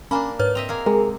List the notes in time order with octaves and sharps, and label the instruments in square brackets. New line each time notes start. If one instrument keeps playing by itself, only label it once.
[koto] A#3 D4 [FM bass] C#4 [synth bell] G#5 A#5 B5
[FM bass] G#2 [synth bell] B4 C#5 F6
[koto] C4 D#5 E5 [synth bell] F7
[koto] A#3 G#4 G#5
[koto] C3 [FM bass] G#3 [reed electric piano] G#4 A#4